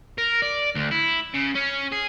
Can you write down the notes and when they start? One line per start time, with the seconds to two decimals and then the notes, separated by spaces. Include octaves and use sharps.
0.18 A#4
0.42 D5
0.75 D2
0.91 E4
1.34 C#3
1.56 C#4
1.92 G#4